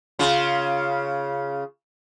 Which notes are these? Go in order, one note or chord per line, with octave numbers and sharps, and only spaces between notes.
C#3 F4